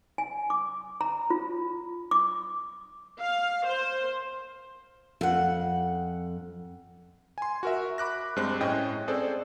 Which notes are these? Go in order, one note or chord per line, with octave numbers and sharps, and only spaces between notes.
G#5
D6
A#5
F4
D6
F5
C5
F2 F#5
G#5 C6
F#4 A#4 E5
B5 D6 F#6 A#6
G2 G#3 C4 C5 F#6
A2 C#4 D#5 G5
C4 G#4 A4 C5 D5